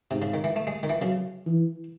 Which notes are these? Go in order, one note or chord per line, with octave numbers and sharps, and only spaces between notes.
G#2 C3
C#3
D#3
E3
A3
G#3
D#3
E3
C#3 F#3
E3